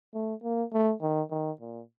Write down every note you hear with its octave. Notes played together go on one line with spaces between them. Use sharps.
A3
A#3
A3
D#3
D#3
A#2